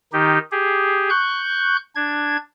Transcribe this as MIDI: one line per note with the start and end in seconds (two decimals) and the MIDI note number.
0.13 0.39 51
0.13 0.39 63
0.13 0.39 67
0.52 1.10 67
0.52 1.10 68
1.10 1.77 85
1.10 1.77 90
1.10 1.77 91
1.96 2.37 62
1.96 2.37 92